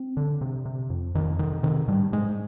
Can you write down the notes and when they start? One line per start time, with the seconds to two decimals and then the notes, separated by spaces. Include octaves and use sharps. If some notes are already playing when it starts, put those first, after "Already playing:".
Already playing: C4
0.17 D3
0.41 C3
0.66 C3
0.90 F2
1.15 F2 D#3
1.39 C3 D#3
1.63 C3 D#3
1.88 G#2 G3
2.12 G#2 G#3